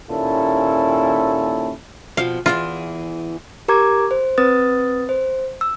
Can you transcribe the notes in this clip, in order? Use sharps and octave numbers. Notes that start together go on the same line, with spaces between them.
D#2 A#2 C#4 E4 A4
F2 B2 F3 F5
E2 E3 F4 G#4
G4 A#4 A#5 D6 G#6
C5
C4 B4 D#6 A6
C5
E6